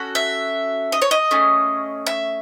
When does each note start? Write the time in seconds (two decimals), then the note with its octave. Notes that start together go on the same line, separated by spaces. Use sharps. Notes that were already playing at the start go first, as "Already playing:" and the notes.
Already playing: C#4 F#4 A4
0.15 E5
0.92 D#5
1.02 C#5
1.11 D#5
1.31 A3 C#4 G#4
2.07 E5